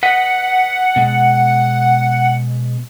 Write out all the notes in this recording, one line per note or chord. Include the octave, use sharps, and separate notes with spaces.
B4 D#5 F#5
B2 G#3